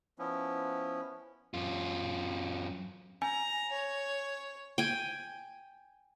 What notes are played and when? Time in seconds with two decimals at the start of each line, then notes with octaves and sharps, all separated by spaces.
0.19 F3 B3 C#4 E4
1.54 F#2 F4
3.22 G#5 A#5
3.71 C#5
4.78 G5 G#5